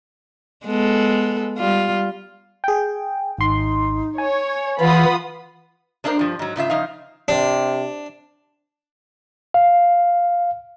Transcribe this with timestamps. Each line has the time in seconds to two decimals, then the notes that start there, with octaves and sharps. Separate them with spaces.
0.66 G#3 B3 A4
1.58 G3 F4
2.64 G#4 G5
3.38 G#1 D#4 C6
4.18 C#5 G#5
4.80 E3 F4 F#5 B5 D#6
6.04 A#3 D4 E4 F4 A#4 C5
6.19 G2 F3
6.39 G#2 F#3
6.56 G#2 C#3 F4 E5
6.70 C#3 F3 D#4 F5
7.28 C3 D4
9.54 F5